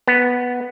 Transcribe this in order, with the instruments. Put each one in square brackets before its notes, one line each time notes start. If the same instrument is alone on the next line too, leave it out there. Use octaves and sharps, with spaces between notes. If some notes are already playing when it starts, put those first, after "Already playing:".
[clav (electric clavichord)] B3